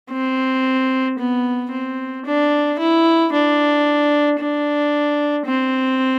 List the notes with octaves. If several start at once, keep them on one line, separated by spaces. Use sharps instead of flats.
C4
B3
C4
D4
E4
D4
D4
C4